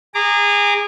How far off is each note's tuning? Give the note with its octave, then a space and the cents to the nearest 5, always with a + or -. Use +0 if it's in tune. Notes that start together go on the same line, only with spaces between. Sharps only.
G#4 -25 A#5 -15 D6 +0